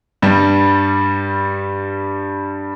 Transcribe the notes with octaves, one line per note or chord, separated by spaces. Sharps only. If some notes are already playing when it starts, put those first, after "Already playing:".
G2 G3